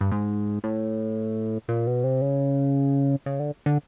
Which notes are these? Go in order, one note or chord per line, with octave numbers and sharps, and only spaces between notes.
G2
G#2
A2
A#2
B2
C3
C#3
C#3
D3
D3